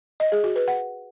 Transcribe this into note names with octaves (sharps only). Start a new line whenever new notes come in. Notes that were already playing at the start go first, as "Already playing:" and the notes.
D#5
G#4
F#4
B4
F#5